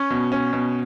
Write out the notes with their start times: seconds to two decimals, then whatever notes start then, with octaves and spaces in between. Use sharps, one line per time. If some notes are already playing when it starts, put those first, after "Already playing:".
Already playing: C#4
0.10 B2
0.32 C#4
0.53 B2